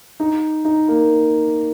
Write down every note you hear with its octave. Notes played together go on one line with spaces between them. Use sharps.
D#4
D#4
A#3